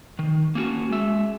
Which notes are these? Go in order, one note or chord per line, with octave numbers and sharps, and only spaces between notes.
D#3
A#3 C#4 F4 F#4
G#3 E5